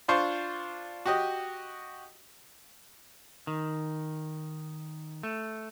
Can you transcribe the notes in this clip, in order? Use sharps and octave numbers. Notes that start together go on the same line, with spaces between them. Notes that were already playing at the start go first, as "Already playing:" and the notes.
D4 F4 C5 C6 C#6
F#4 G4 D#5
D#3
A3